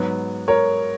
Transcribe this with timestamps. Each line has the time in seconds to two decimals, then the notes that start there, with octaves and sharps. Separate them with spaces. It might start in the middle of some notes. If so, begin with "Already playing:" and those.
Already playing: G#2 F#3 B3
0.48 A#4 C#5